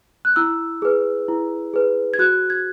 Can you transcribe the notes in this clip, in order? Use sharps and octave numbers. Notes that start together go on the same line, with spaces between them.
F#6
E4 E6
G#4 B4
E4
G#4 B4
G#6
F#4 F#6
G#6